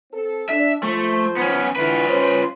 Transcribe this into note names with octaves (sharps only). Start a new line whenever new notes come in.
C4 A4
D4 E5
F3 A3 C5
B3 C#4
D3 E3 F4 B4
C#4 C5